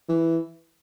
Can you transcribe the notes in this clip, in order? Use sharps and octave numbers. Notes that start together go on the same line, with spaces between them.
E3